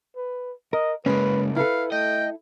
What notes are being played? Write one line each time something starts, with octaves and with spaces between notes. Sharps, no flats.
B4
A#4 D#5
C#3 G#3 A#3 C#4 B4
E4 A4 B4 F5
A3 D#5 G5